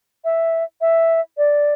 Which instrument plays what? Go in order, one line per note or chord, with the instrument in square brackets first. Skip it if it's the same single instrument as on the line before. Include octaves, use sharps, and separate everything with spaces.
[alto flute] E5
E5
D5